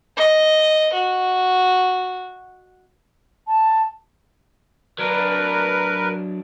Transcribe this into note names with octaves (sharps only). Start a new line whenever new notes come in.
D#5
F#4
A5
F#3 D4 A#4 B4